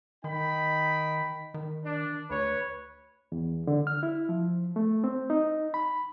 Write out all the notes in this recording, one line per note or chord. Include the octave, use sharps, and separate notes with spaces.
D#3 D#4 G5 B5
D#3
D4
D2 B4 C#5
E2
D3
F6
E4
F3
A3
C4
D#4
B5